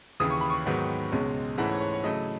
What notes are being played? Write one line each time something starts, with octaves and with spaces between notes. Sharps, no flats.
D#2 C#3 E3 D#6
C#6
B5
C#6
G#2 D#3 F#3 B3
C#2 B2 G#3 C#4
G#2 E3 A3 C#4 E4 F#5
C#5
C#5
C#5
C#3 F#3 A3 E4 D#5